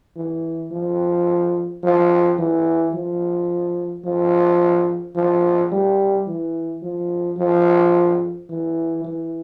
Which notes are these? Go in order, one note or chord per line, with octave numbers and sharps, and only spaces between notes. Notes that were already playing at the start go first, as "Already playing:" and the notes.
E3
F3
F3
E3
F3
F3
F3
G3
E3
F3
F3
E3
E3